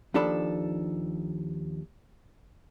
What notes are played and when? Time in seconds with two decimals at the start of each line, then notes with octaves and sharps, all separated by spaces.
0.14 D#2 F3 D4 A4 B5